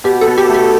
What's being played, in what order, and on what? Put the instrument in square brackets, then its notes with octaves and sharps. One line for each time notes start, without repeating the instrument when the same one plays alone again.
[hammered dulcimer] B2 [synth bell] G4
[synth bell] A4
[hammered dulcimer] B2
[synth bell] G4
[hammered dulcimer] A3
[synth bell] G4